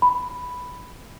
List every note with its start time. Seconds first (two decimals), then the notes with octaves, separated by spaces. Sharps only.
0.02 B5